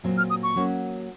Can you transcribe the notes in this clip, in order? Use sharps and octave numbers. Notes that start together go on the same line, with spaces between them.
A#2 F#3 C4
F6
D#6
C#6
F#3 A#3 C#4 F#4